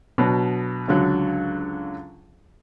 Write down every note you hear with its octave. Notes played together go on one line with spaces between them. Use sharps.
B2 F#3 D4
C#2 D3 F#3